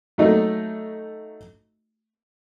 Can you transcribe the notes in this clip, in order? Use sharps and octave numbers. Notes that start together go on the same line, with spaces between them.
F#3 A3 D#4